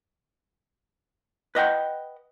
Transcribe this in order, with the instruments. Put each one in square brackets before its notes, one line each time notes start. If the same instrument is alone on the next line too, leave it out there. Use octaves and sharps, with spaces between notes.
[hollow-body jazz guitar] B4 D#5 F#5 G5